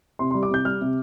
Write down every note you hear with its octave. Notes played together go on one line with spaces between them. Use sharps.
C3 C6
G3 C6
D6
C3 G6
G3 F6
C3